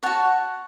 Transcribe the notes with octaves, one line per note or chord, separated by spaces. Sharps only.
F#4 C#5 F#5 A5